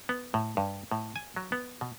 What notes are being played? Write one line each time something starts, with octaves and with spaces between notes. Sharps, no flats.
B3
A2
G2
A2
G#5
F#3
B3
B2